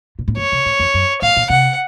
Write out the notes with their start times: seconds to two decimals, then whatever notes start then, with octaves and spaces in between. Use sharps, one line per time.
0.19 A#2
0.28 A2
0.37 F#2 C#5
0.52 C3
0.66 A2
0.80 F2
0.94 F#2
1.22 A2 F5
1.37 A#2
1.50 C3 F#5